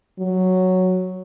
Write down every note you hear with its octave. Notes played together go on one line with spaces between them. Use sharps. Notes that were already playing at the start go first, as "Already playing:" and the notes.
F#3